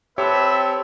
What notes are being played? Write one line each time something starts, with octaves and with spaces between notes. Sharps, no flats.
C4 G4 A4 B4 C#5 E5